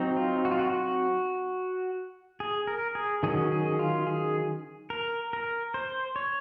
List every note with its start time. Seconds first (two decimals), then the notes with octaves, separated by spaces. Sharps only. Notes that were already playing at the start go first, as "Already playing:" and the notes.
Already playing: F#3 C4 D#4
0.17 F4
0.45 F#4
0.51 F4
0.59 F#4
0.73 F#4
2.40 G#4
2.67 A#4
2.95 G#4
3.23 D#3 F#3 C#4 G#4
3.52 G#4
3.79 F4
4.07 G#4
4.90 A#4
5.33 A#4
5.74 C5
6.16 C#5